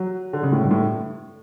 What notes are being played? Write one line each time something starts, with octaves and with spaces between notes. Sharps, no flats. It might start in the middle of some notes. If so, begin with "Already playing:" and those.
Already playing: F#3
D3
C#3
A2
G2
A2